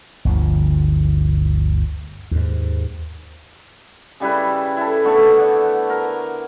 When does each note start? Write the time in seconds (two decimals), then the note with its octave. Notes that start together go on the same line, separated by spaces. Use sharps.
0.25 G1 D2 F3
2.31 D#2 G#2
4.20 C#3 G3 E4 B4
4.77 E4 A4
5.04 D3 A3 B3
5.38 D5 F#5
5.90 A#4